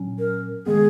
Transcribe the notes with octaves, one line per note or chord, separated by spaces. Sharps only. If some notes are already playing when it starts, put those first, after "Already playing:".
Already playing: A#2 F#3 C#4
A#4
D#3 G#3 B3 G#4